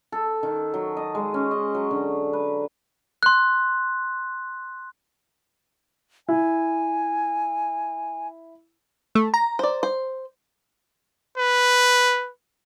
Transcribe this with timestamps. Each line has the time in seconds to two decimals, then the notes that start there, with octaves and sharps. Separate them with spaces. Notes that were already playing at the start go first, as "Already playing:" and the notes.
0.12 A4
0.43 D#3
0.74 F#3
0.97 D#5
1.15 G#3
1.34 C#4
1.51 D#5
1.75 F#3
1.91 D3
2.33 B4
3.23 C6 F#6
6.28 E4 G#5
9.15 A3
9.34 A#5
9.59 C5 D5
9.83 C5
11.38 B4